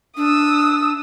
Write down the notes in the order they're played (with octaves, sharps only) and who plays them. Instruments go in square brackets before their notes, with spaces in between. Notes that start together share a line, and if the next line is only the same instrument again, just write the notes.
[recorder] D4 [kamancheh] D#6 E6